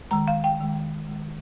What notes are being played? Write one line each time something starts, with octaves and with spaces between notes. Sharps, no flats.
D#3 G#3 A#5
F5
G5
D#3 G#3
D#3 G#3